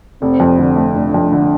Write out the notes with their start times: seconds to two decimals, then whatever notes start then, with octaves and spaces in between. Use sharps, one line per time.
0.22 F1 C4
0.40 F2
0.59 D3
0.77 A3
0.96 F1 D4
1.14 F2
1.32 D3